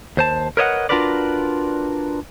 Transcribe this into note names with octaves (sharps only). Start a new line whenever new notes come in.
D#2 C5 A5
A#4 B4 C#5 D#5 E5 F#5
D4 F4 F#4 A#4 B4 D5